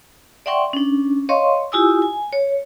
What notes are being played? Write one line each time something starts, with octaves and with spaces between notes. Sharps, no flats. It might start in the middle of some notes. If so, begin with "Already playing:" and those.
D5 E5 F#5 G5 C6 C#6
C#4 D4
C#5 D#5 F5 C6 C#6
E4 F4 G4 G#5 D#6 E6
G#5
C#5